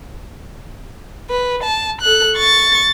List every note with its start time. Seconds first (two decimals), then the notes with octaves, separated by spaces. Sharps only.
1.30 B4
1.63 A5
2.01 A4 F#6
2.36 C#6 A6